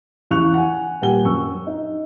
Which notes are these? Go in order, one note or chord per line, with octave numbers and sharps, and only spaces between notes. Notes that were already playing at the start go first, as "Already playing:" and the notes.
E2 C#3 F5 C#6 F#6 F7
F#5 G#5
D#1 G4 F#5 G#5 G7
F#2 C#6 E6
D#4